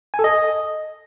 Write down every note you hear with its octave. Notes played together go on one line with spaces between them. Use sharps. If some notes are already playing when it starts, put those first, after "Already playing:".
G#5
A4
D#5